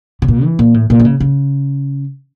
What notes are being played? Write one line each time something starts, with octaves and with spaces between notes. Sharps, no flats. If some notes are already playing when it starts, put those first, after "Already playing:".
C#3
A#2
E3
A#2
A2
A#2
D3
C#3
C#3